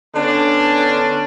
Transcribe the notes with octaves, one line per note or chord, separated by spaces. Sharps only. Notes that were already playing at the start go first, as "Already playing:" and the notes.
D3 B3 C#4 D4